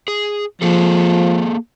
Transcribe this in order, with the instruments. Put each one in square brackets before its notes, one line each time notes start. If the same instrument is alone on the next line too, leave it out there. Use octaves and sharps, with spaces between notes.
[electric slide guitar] G#4
[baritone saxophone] F3 [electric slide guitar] A#3 G#4 A4